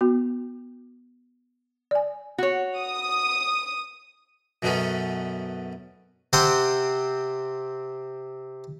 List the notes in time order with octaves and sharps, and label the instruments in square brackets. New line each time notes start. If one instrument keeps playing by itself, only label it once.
[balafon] B3 F#4
D5 G#5
[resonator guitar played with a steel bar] F#4 C#5
[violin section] D#6
[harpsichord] F#2 B2 F#3 A3 B3 C#4
C3 C4 F#5 G5 C6 D#6